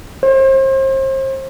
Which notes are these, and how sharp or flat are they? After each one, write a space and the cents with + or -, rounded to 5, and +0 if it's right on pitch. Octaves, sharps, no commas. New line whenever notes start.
C5 +35